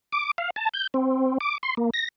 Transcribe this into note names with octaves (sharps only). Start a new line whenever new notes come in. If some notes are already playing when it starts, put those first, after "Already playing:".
D6
F5
A5
G6
C4
D6
C6
A#3
A#6